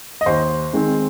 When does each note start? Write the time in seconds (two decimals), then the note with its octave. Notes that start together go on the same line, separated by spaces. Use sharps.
0.21 D#5
0.26 D#2 C5
0.73 D#3 G#3 C4